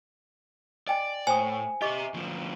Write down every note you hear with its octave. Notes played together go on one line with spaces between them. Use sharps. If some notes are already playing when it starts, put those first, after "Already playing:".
D5 D#5 G5 G#5
A2 C5 G5 G#5 D#6
G4 D#5 E5 C#6 D6
D2 F3